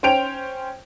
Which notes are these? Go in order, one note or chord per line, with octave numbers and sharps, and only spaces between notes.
C#4 C5 G5 D7 F7